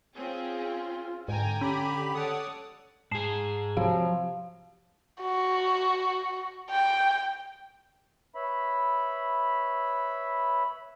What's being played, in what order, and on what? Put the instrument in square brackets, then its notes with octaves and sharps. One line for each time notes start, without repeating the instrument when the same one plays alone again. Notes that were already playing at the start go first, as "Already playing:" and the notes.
[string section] C4 C#4 G#4 [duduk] F4
[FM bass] G#2 [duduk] D3 [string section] G5 G#5 A#5
[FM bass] C#4 [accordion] G4 B5
[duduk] A4 [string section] C#5 D5 [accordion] F#5 D#6
[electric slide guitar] G#2 G#4 [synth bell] A5 C7 E7
[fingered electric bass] C3 F#3 [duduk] F3 [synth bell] G4 F5
[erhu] F#4
G5
[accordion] B4 C#5 E5 B5